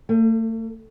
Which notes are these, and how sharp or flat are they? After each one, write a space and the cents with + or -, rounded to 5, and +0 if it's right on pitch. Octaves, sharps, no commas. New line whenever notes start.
A3 +40